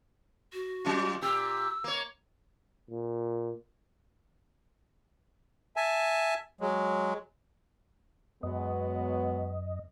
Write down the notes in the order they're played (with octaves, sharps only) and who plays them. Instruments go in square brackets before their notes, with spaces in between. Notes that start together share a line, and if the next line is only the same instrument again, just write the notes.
[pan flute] F#4
[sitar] F#3 C#4 F4
[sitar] A#2 G4 [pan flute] E6
[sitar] A#3 C#5
[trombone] A#2
[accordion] E5 G#5 A5
F#3 G#3
[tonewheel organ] F#2 D#5 [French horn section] F#3 G#3 B3